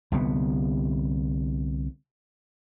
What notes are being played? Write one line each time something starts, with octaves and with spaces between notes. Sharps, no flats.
C2 D3 B3